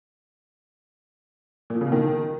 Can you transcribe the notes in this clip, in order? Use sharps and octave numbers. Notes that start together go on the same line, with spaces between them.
A#2
F3
C#3
B2
D#3